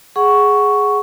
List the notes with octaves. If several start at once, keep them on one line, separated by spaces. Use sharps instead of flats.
G#4 F#5 C#6